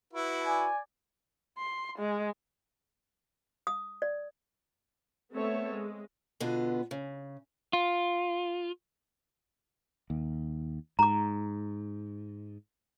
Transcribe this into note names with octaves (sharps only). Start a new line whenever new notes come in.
E4 F#4 B4
D5 G#5
C6
G#3
D#6
D5
A3 B3 C4 A4 C#5 E5
G#3
B2 D3 B3 F4
C#3
F4
D#2
G#2 A#5 D6